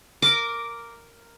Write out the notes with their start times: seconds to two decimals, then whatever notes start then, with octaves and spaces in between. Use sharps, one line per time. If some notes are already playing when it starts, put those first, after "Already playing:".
0.22 A#4 D6